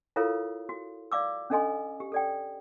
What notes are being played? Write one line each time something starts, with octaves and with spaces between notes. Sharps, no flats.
E4 F4 A4 A#4 C#5 F5
F#4
D5 F5 D6 E6
C#4 D4 A4 D#5 G#5 C6
G4
A4 D5 G5